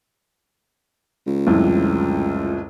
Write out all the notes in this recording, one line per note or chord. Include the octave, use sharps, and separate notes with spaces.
C#2
C2 F2 A2